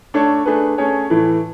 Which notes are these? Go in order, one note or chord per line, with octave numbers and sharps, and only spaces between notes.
A3 D4 A4 C#5
A3 D4 G#4 B4
A3 C#4 G#4 C#5
A2 E3 A3 E4